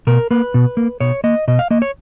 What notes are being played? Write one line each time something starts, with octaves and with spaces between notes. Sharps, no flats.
B2 A#4
A#3 B4
B2
A#3
B2 C#5
A#3 D#5
B2 D#5
F5
A#3 D#5
C#5